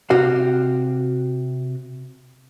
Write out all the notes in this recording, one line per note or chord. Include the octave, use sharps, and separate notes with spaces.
C3 F#4 G4 F5